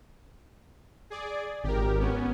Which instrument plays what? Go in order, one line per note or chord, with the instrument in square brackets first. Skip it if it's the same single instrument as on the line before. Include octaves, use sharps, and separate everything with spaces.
[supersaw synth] G#4 D5
[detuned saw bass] G#1 [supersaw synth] G4 A#4
[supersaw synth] B3 C#4